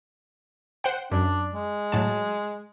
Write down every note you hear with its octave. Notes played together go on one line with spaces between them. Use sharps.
C5 F#5 G5
F#2 D4
G#3
A2 F#3 A5